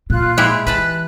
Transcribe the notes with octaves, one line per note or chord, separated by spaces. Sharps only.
A#2 F4 F#6
G#3 E4 G4
E3 B4 A5 B5 F#6